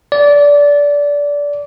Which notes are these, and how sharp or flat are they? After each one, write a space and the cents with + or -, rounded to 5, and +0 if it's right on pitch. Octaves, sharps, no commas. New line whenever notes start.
D5 -20